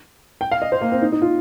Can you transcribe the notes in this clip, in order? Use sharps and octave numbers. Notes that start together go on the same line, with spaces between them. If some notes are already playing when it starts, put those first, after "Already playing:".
G5
F5
D#5
C5
A#3
C4
D#4
D#4
F4